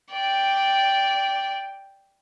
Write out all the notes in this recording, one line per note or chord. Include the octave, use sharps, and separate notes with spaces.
D5 G5